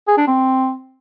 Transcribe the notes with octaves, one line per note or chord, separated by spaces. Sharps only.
G#4
D4
C4